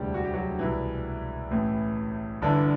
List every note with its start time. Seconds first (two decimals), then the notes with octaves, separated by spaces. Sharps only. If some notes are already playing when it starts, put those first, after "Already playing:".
Already playing: E1 D2 C3 E3 G3 G4
0.14 F#4
0.24 G4
0.34 F#3 F#4
0.59 C2 B2 E3 E4
1.51 A1 A2 E3
2.42 G1 G2 D3 E3 D4